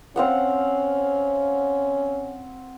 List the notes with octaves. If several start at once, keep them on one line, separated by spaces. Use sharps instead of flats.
C4 C#4 F5 F#5